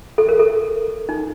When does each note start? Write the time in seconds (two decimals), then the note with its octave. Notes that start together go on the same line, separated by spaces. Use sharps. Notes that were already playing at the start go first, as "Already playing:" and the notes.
0.18 A4
0.29 A#4
0.39 A4
1.09 D#4